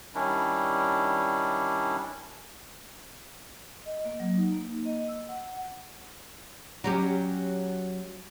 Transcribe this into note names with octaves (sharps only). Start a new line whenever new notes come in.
D#3 G3 C#4 D4 E4
D#5
A#3
F#3
D#4
A#3
D#5
E6
F#5
F#3 C#4 G4